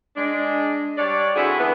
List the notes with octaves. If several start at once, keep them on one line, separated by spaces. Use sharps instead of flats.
G#3 D4
G3 D4 C#5 D5
D3 C4 E4 F#4 G#4
E3 B3